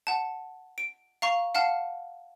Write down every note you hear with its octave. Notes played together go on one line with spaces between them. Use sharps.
F#5 A5
D7
F5 A#5 C#6
F5 F#5 A5 F6 C7